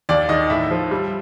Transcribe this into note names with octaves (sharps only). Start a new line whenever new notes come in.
D#2 D5
D#3 D#5
A2 E5
F3
G3